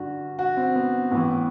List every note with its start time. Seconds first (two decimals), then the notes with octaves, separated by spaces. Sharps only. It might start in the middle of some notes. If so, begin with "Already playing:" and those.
Already playing: G2 D3 F#4
0.39 F#4
0.57 C4
0.75 B3
1.11 A2 E3 B3